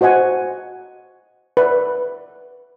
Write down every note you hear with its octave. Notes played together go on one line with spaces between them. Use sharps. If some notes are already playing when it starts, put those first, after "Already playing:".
F#4 C5 D#5 F#5 G#5
B4 D5 E5